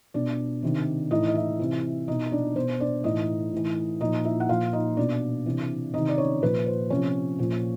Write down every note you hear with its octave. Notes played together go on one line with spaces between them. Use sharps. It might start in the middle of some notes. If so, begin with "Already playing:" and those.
B2 D4 D5
C3 D#3
A2 E3 D#4 D#5
D#5
E4 E5
C3 E3
B2 D#4 D#5
D4 D5
B2 C5
D4 D5
A2 E3 D#4 D#5
A2 E3
A#2 F3 D#4 D#5
E4 E5
F#5
A#2 F3 F4 F5
D#4 D#5
B2 D4 D5
C3 E3
C3 D#3 D#4 D#5
D5
C#4 C#5
A#2 F3 B4
C5
C3 F3 C#4 C#5
A#2 F3